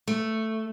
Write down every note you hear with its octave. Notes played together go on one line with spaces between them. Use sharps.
A3